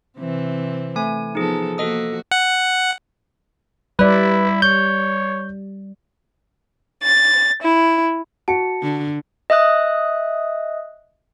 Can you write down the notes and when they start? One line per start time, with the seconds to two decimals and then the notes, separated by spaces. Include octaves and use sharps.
0.18 C3 E3 C4
0.96 A3 G#5
1.35 F3 B3 D#4 G#4 A4
1.78 F3 A#3 F#4 A4 D#5 D#6
2.31 F#5
3.99 G3 E4 B4 D5
4.62 C#5 G6
7.02 A6
7.61 E4
8.48 F#4 A5 C#7
8.82 D3
9.50 D#5 E5 D#6 F#6